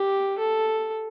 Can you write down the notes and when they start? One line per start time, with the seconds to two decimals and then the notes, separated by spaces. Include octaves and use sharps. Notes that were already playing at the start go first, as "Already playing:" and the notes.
Already playing: G4
0.38 A4